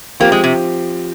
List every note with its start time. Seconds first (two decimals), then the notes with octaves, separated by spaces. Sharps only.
0.20 F3 A#3 C4 G4
0.32 G#3
0.44 C3